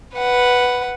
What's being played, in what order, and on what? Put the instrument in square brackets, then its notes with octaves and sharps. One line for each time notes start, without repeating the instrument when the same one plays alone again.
[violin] B4 F#5